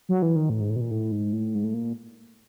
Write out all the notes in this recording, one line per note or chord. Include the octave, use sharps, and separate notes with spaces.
F#3
E3
D#3
A2
G#2
A2
B2
A#2
A2
G#2
A2
G#2
A2
A#2